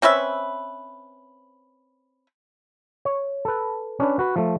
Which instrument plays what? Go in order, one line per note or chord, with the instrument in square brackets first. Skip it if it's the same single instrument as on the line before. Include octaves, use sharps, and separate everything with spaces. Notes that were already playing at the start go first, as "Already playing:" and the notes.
[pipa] C4 C#4 B4 E5
[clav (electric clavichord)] C#5
A4 B4
C#4 D4 B4
F#4 B4
F3 A3